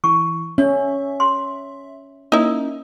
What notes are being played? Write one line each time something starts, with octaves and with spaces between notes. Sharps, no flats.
E3 C#6
C#4 C#5 E5
C6
A#3 C#4 D#4 E4